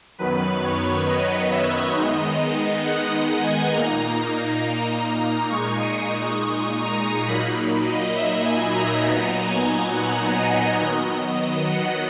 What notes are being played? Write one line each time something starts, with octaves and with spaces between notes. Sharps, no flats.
F#2 D#3 F#3 B3 B4
C#5
D#5
E5
D#3 G#3 B3 D#4 D#5
F#5
F#5
G#5
A#2 A#3 D#4 A#5
A#5
A#2 G#3 D#4 C#6
D#6
D#6
C#6
A#5
A#2 F#3 A#3 D#4 B5
D#5
E5
G#5
A#5
A#2 F#3 B3 D#4 A#5
G#5
F#5
D#5
D#3 F#3 B3
F#5